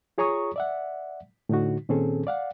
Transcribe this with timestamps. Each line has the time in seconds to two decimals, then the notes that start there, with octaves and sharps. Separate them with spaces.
0.18 F4 G#4 C#5 A#5 C#6 D#6
0.56 D5 E5 F#5
1.49 A2 D3 D#4 F#4
1.89 A#2 D#3 C4 C#4 G#4 A4
2.27 D5 F5 F#5